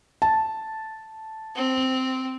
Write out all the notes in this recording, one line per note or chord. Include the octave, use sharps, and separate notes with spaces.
A5
C4